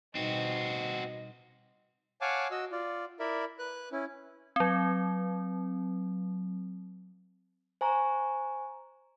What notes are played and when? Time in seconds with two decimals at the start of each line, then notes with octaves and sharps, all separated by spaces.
0.15 B2 G3 C4 D#4 F#4 D#5
2.21 C#5 F5 F#5 G#5 A5 D6
2.51 F#4 D#5 E6
2.72 F4 D5
3.20 E4 A#4 D5 E5 B5
3.59 B4 F#6
3.92 C#4 E4
4.56 F#3 C4
7.81 C5 G#5 A#5 C#6